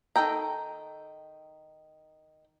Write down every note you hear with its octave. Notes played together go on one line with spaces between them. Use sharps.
D#3 G#3 A4 G5 A#5